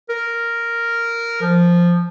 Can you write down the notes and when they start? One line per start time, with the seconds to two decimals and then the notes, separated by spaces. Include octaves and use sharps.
0.09 A#4
1.42 F3